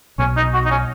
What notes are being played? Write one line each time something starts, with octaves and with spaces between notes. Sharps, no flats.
B1 B2 C#4
D#4
F#4
D#4
C#4